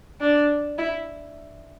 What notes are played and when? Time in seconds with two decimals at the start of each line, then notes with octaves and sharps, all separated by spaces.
0.21 D4
0.78 E4